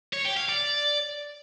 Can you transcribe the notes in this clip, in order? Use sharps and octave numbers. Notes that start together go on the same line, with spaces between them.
C#5
G4
F5
D5